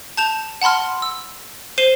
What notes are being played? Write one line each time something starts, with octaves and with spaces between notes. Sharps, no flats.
A5 G6 E7 F7
F#5 A5 B5 C6 F6
E6
C5 C7 D#7 E7 G7